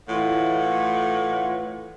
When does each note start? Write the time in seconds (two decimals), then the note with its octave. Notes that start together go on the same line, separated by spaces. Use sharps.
0.09 A2 E3 F4 F#5